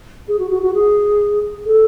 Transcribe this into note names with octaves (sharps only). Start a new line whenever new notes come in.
G#4
F#4
F#4
F#4
G#4
A4